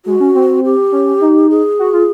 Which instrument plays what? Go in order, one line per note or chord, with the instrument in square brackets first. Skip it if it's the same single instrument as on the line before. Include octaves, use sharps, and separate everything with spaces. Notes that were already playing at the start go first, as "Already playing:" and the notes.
[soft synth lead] G#3 [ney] F#4
[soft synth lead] C#4
C4
[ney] G4
[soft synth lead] C#4
D#4
[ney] G#4
[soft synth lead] F#4
F4